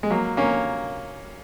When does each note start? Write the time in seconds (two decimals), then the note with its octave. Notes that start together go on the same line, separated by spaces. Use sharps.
0.03 G#3
0.10 F#3 A#3
0.37 A#3 C#4